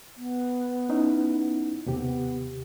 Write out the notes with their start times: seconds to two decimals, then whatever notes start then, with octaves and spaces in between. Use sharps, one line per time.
0.17 B3
0.89 C#4 D#4 E4
1.86 D#2 C3 B3 G4